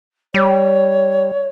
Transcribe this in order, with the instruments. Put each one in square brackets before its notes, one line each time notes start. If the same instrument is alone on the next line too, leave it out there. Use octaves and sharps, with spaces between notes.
[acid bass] G3 [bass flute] C#5